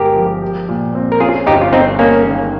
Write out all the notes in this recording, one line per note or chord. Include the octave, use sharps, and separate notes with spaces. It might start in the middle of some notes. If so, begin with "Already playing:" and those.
Already playing: G1 G#3 G4 A#4
F3
G4
A#2
C4
A#4
C#4 F4 G#4
G1 D#4 G4
F4
G3 C4 D#4
A#3 C#4 G#4
D#3